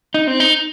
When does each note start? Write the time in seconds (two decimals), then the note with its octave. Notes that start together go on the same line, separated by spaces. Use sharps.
0.14 D#4
0.27 C4
0.40 D#4